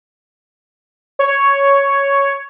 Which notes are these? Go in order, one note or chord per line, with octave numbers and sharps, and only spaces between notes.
C#5